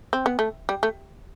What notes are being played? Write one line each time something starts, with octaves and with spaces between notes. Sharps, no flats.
C4
B3
A3
G3
A3